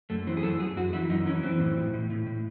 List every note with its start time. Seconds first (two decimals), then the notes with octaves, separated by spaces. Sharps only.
0.10 F#2 A3
0.27 E3 C4
0.37 G#4
0.43 F#2 A4
0.59 F#2 G#4
0.76 F#2 F#4
0.93 E3 E4
1.10 F#2 D#4
1.26 E3 C#4
1.43 E3 C4
1.60 A2
1.77 A2
1.94 A2
2.10 A2
2.27 A2